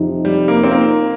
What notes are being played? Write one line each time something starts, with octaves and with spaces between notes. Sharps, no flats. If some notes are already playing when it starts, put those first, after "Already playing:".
Already playing: F2 C3 F3 D#4
G3
A#3
C4
A#3